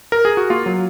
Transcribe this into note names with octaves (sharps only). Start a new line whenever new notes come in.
A#4
G#4
F#4
A#3 F4
F#3